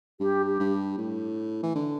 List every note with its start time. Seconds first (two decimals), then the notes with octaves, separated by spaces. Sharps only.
0.20 G2 G4
0.46 G4
0.60 G2
0.98 A2
1.63 E3
1.75 D3